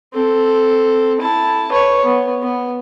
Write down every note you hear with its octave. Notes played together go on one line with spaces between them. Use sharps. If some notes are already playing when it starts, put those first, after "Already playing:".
C4 A4
E4 A5
B4 C#5
B3
B3